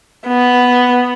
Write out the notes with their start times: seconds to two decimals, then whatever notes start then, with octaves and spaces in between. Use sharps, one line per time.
0.28 B3